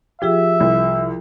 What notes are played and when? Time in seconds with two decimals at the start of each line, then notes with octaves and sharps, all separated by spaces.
0.22 F3 F4 G4 G#4 E5
0.60 C2